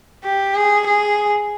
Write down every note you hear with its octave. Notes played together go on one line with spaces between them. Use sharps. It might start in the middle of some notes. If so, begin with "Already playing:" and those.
G4
G#4
G#4